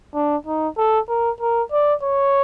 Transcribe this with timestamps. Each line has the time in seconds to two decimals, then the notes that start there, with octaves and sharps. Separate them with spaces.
0.14 D4
0.47 D#4
0.78 A4
1.09 A#4
1.41 A#4
1.72 D5
2.03 C#5